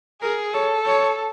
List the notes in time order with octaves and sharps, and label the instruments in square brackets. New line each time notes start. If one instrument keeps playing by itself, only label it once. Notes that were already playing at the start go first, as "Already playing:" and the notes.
[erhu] G#4 [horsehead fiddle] A#4
[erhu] A4 [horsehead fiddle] C#5
[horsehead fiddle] C#5